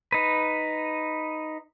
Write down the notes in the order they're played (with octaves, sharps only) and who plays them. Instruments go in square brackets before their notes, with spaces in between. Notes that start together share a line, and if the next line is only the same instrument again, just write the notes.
[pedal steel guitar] D#4 B4